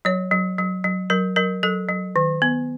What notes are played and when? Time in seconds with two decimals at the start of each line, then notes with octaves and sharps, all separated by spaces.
0.05 F#3 C#5
0.31 F#3
0.59 F#3
0.84 F#3
1.10 F#3 A#4
1.36 F#3 A#4
1.63 F#3 A4
1.89 F#3
2.16 D#3
2.42 B3